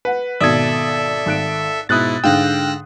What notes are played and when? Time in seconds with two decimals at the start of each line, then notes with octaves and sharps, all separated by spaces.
0.05 B4 F#5
0.41 G#1 B2 A4 D5 E5 D#6 G#6
1.26 G#1 F#6 D7
1.89 G#2 B2 E4 D#6 F#6 A6
2.24 G#2 D3 F5 G5 E6 F#6 A#6